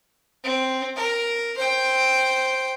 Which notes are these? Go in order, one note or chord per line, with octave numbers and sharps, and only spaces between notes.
C4
A#4
C5 G5